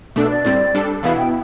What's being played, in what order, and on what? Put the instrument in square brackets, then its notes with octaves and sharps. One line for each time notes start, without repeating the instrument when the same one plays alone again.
[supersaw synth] B2 A3 D4 [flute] A4
[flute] D5
[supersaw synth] A2 G3 C4
G3 D4 A4
[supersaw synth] E2 B2 B3 E4 [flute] F5
[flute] G5